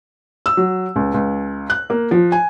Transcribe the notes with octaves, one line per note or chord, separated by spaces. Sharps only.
E6
F#3
C#2
C#2
F#6
A#3
F3
G#5